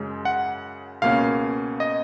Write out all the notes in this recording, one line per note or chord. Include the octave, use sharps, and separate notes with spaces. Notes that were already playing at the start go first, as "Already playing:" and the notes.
Already playing: F#2 C#3 G#3
F#5
C#2 B2 A#3 C#4 F5
D#5